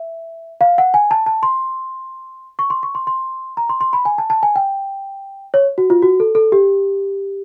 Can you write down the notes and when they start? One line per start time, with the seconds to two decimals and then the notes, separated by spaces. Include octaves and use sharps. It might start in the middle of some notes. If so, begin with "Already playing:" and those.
Already playing: E5
0.61 F5
0.78 F#5
0.94 G#5
1.11 A5
1.26 A5
1.43 C6
2.59 C#6
2.70 C6
2.83 C#6
2.95 C6
3.07 C6
3.57 A#5
3.69 C6
3.81 C6
3.93 B5
4.05 G#5
4.18 A5
4.30 A5
4.43 G#5
4.56 G5
5.54 C#5
5.78 F#4
5.90 F4
6.02 F#4
6.20 A4
6.35 A4
6.52 G4